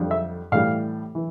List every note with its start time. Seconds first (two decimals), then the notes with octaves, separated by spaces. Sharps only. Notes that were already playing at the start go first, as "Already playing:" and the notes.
Already playing: F2 D3 G3
0.11 E5
0.52 A2 E3 G3 F5
1.15 E3